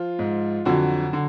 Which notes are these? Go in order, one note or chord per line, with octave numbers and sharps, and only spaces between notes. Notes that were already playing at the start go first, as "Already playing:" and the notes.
Already playing: F3 F4
G#2
F2 D3 F#3 F#4
D3